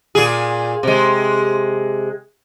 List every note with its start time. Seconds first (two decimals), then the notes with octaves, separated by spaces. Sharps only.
0.15 A#2 G#4
0.83 C3 G#3